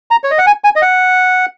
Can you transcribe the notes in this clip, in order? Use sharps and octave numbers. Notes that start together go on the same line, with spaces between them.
A#5
C#5
D#5
F#5
G#5
G#5
D#5
F#5